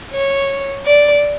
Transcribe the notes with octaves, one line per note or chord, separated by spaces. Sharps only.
C#5
D5